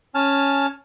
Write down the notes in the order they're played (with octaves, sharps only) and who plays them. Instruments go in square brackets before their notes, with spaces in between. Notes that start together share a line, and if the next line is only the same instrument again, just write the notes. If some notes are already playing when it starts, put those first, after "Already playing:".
[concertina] C#4 G#5 A5 F6